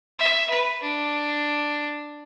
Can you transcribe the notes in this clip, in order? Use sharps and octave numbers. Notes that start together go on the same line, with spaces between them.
E5
B4
D4